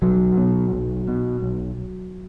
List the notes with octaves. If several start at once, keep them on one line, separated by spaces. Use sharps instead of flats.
B1 F#3
B2
B1
B2
B1